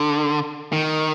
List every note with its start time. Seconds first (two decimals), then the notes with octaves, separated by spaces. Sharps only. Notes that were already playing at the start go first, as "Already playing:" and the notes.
Already playing: D3
0.73 D#3